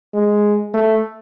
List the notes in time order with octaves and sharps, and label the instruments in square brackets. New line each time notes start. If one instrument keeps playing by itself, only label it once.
[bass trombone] G#3
A3